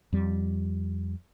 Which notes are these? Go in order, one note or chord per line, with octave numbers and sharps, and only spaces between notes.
F2 G3